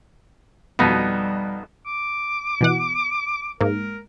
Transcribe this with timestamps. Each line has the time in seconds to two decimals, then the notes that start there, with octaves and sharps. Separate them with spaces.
0.79 F2 B2 G3 B3 D#4
1.86 D6
2.61 B2 E3 F#5
3.61 G#2 A#3 A#4